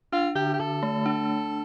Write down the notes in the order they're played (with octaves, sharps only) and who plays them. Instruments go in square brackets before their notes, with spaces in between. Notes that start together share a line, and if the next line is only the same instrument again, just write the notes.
[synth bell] D4 [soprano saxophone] F4
[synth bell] D3 [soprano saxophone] G4
[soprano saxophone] G4
[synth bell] D3 [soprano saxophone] A4
[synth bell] A3
D4